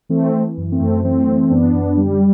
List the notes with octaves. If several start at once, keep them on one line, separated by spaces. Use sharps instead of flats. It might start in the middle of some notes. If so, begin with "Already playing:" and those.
E3 A3 C4
E3
F#2
A3 C4
F#2
E3 A3 C4
E3
F#2 B3 D4
F#2
D3 G3